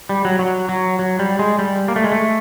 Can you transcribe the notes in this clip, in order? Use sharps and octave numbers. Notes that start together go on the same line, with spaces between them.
G3
F#3
F#3
F#3
F#3
G3
G#3
G3
A#3
A3
G#3
A3